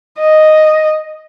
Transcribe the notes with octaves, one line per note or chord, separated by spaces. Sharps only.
D#5